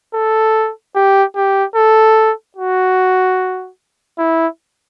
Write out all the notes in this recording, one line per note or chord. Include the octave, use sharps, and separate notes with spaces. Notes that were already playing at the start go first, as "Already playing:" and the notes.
A4
G4
G4
A4
F#4
E4